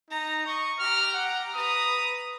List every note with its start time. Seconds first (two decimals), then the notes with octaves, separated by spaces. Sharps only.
0.11 D#4 A#5
0.47 D#5 C#6
0.80 G4 A#5 F6
1.14 F#5
1.56 B4 A#5 D#6